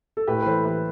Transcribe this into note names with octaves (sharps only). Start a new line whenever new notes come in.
A4
A2 G4 B4
B4
E3 A4 C5
E3 G4 B4